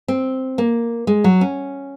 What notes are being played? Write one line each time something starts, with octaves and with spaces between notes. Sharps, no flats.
C4
A#3
G#3
F#3
C#4